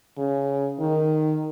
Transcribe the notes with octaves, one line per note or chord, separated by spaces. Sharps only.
C#3
D#3